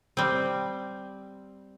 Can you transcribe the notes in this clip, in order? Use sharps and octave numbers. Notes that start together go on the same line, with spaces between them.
G3 C4